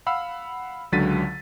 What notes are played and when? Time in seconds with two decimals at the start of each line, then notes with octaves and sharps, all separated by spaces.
0.06 F5 F#5 B5 E6
0.92 C#2 D3 F#3 A6 B6 D#7